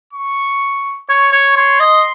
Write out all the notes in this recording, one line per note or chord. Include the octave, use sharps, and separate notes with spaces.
C#6
C#5 C#6
C#5
C#5 C6
D#5